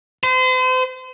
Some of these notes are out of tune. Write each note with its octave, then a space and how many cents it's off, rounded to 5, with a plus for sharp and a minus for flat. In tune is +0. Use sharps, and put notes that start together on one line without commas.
C5 -35